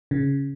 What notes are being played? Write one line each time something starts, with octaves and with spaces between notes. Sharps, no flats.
C#3